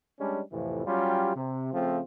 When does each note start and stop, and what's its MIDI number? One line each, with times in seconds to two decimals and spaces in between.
0.20 0.41 55
0.20 0.41 56
0.20 0.41 61
0.20 0.41 62
0.52 0.86 41
0.52 0.86 45
0.52 0.86 48
0.52 0.86 52
0.52 0.86 53
0.86 1.33 54
0.86 1.33 55
0.86 1.33 61
0.86 1.33 65
0.86 1.33 67
1.35 1.73 48
1.74 2.01 49
1.74 2.01 53
1.74 2.01 57
1.74 2.01 60